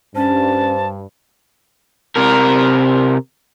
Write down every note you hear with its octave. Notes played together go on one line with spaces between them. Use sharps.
G2 C#4 C5 A5
C3 A#4